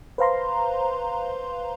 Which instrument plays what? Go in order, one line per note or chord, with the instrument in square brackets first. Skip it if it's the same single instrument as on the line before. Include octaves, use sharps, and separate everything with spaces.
[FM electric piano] B4 C5 F5 A#5 C6